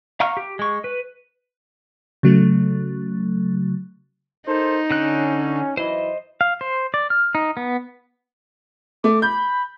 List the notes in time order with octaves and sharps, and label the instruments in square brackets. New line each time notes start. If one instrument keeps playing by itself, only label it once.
[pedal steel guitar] F5 F#5 A#5 C#6 F6
G4
G#3 C#6
B4
[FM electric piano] C#3 F#3 A3
[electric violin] D#4 [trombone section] A4 A#4 C5
[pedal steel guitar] D3 F#6 [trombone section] C#4
[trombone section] E3 F#3 E4 [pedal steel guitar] C5 D#5
[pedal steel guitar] F5
C5
D5
F6
D#4
B3
[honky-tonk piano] A3 [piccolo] D6
[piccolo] B5 [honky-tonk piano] G6